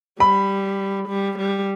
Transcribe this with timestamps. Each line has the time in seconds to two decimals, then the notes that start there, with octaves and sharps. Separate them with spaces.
0.20 G3 B5
1.08 G3
1.39 G3